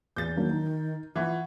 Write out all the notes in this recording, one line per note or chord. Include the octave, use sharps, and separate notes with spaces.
E2 G6 A6
D#3 F#3 A#3 D4
D#4
E3 F4 E5 F#5 C#6